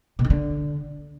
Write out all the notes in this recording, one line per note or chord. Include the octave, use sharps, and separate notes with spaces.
B2
D#3
D3